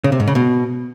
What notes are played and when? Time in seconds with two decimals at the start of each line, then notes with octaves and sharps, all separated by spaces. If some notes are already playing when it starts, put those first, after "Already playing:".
0.04 C#3
0.12 C3
0.20 G#2
0.27 C#3
0.35 B2